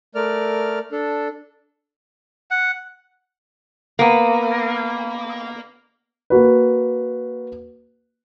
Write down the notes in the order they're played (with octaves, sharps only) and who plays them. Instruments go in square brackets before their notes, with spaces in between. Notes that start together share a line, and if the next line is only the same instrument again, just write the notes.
[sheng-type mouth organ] A3 A#4 D5 F6
D4 A4
[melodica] F#5
[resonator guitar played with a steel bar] A#3 B3
[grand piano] A#3 F#4 B4